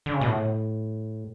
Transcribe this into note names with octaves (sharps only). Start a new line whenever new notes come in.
D3
C#3
B2
A2